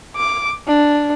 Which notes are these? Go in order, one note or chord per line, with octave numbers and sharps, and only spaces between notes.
D6
D4